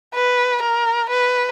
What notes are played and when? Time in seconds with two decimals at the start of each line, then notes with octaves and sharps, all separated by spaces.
0.15 B4
0.63 A#4
1.11 B4